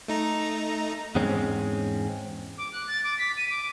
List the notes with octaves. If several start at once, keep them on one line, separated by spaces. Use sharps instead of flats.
A3 D#4 A#5
E2 G#2 G#3 C4 C#4
D6
F#6
A6
D6
B6
D#7
D6